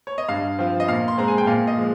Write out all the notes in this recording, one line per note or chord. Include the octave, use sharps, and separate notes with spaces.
C#5
D#5
G2 F5
F3 C4 F4
D#5
A#2 F5
C6
G#3 C4 A#5
G#5
G5
A#2 F5
D#5
F3 G#3